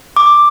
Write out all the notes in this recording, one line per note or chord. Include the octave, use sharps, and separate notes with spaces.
D6